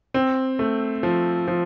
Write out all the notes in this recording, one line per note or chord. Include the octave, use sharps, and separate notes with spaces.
C4
A3
F3
F3